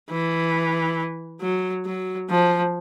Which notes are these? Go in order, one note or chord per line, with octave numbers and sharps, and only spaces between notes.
E3
F#3
F#3
F3